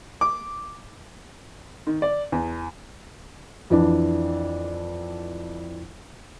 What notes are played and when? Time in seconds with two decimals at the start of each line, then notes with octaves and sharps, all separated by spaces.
0.21 D6
1.87 D#3
2.02 D5
2.32 E2
3.70 F2 E3 D4